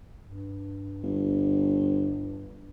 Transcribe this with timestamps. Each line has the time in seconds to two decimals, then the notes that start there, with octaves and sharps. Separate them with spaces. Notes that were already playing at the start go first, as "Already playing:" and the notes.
0.23 G2
1.03 G1